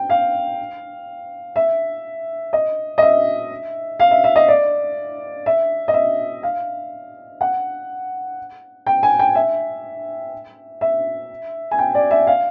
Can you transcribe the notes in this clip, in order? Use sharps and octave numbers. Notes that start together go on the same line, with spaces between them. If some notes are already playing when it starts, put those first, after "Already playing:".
Already playing: G5
F5
E5
D#5
D#5
E5
F5
E5
E5
D#5
D5
E5
D#5
E5
F5
F#5
G5
G#5
G5
E5
E5
G#5
G5
D5
E5
F5